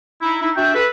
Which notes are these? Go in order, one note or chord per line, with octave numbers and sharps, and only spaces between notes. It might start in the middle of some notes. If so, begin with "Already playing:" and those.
D#4 E4
D#4 E4
D4 F#4 E5 G5
A4 B4